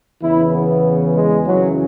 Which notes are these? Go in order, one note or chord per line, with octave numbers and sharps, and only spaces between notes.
E2 C#3 E3 E4
B3
G#3
F#2 C#3 E3 F#3